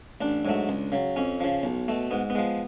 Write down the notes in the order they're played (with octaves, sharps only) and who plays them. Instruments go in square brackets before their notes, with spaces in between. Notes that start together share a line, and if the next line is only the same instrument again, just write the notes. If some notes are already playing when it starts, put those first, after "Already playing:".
[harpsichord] A1 D4
G#2 F#3 A3
C#2
C#3 F#3
F2 C#4
C#3 F3
B1
B2 A3
G#2 B3
B3
F3 G#3